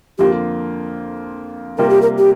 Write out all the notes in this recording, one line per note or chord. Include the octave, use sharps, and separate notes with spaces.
F2 D3 A#3 F4 G4
C3 G3 A#3 F4 A#4
G4
A#4
G4